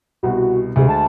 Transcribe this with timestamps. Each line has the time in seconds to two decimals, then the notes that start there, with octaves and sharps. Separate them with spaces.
0.23 C2 B2 F#4
0.76 D2 C3 G#3 G#4
0.89 A5